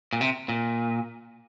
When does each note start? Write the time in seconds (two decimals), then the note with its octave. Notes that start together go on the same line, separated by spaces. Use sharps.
0.13 A#2
0.21 C3
0.49 A#2